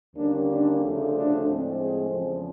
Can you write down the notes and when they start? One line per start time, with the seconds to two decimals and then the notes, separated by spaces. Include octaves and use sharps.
0.15 D#2 D3 G3 A#3 C#4 D4
0.48 D4
0.81 D2 C#3 F3 A3
1.13 D4
1.46 A2 F3 G#3 C4
1.78 G#4
2.11 E2 C#3 F3